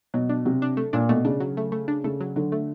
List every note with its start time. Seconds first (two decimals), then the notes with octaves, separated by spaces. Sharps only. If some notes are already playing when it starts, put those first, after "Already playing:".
0.14 B2 F#3
0.29 D4
0.45 C3 F#3
0.62 D4
0.77 A3
0.93 A#2 D4
1.09 B2 A3
1.25 C#3 D4
1.40 F#3
1.57 A3
1.72 A3
1.88 D4
2.04 C#3 A3
2.20 F#3
2.36 D3 F#3
2.52 A3